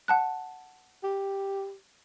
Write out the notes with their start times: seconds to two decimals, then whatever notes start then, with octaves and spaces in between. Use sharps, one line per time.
0.08 F#5 A5 F#6
1.04 G4